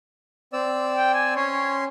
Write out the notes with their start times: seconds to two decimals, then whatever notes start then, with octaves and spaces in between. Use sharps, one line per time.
0.53 C4 D5 E6
0.96 G5
1.14 G#5
1.36 C#4 C#5 C6